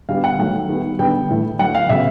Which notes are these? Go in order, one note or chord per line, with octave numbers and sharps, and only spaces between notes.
D3 G3 B3 F5
F#5
D#3 F#3 A3
D#3 G3 B3
D3 G3 B3 G5
A2 E3 A3
D3 F#3 A3 F#5
F5
C#3 F#3 B3 E5